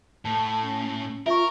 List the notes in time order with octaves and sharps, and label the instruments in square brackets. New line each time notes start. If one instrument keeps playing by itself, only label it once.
[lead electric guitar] A2 [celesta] A5
[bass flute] C#4
[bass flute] F4 [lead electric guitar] A#4 [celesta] E5 C#6